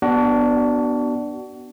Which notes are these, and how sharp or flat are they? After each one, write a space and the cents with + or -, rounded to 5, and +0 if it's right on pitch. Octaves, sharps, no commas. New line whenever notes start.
B3 -10 D4 +0 F#4 +35